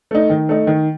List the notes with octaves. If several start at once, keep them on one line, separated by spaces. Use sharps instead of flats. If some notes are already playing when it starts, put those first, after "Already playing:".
A3 D#4
D#3
A3 D#4
D#3